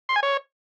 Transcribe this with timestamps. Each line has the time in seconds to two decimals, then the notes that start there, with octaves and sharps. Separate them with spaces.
0.09 C6
0.16 G#5
0.23 C#5